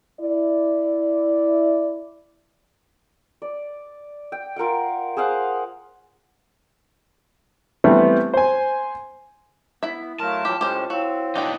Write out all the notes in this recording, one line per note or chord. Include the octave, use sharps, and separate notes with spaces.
E4 D5
D5
G5
F4 A#4 F#5 G5
G#4 C5 F5 F#5
E3 G3 A3 B3 C4
C5 G#5
B3 E4 E5
F#3 A3 A#4 F5 A5 C6
E3 F#3 F4 G4
A2 G#3 C#4 G4 C5
C4 E4 F#4 C#5 F5
B3 D4 D#4 F#4 G5